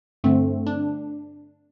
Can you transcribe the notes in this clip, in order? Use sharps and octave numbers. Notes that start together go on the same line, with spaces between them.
G2 D3 A3 C4
D4